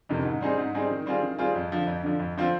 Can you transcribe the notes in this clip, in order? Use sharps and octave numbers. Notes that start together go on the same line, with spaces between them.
F2 C3 D#3
G#2
G3 C4 D#4 G#4
G#2
G3 C4 D#4 G#4
D#3
G3 C4 F4 G#4
D#3
G3 C4 F4 G#4
F2
D3 F3
F2
D3 F3
F2
D3 F3 C4 F4